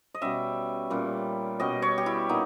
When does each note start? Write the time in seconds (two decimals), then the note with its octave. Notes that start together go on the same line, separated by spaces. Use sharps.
0.14 D#5
0.21 B2 G3 C#4 E5
0.90 A#2 G3 C#4
1.60 B2 G3 C#4 D#5
1.82 C#5
1.98 G4
2.06 E4
2.29 A#2 B3 D#4